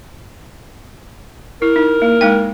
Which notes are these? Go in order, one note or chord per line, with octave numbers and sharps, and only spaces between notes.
E4 A#4
D#4
A#3
G#3 D#4 G5